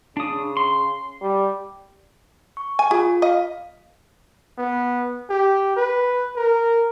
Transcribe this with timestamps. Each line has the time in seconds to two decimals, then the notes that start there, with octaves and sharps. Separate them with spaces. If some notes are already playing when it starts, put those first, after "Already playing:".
0.17 C#3 D4 D#6
0.57 C6
1.21 G3
2.57 C#6
2.79 G#5
2.91 F4 G#4
3.22 D#5 F5
4.58 B3
5.30 G4
5.77 B4
6.36 A#4